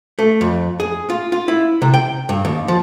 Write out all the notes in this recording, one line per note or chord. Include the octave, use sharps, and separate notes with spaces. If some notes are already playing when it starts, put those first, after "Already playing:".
A3
F2
G#4
F4
F4
E4
C3
G5
G2
D#2
F3